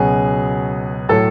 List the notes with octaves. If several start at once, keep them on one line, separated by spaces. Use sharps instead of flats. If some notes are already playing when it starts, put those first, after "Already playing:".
Already playing: C#2 B2 F#3 G#4
A2 F#3 A4 A5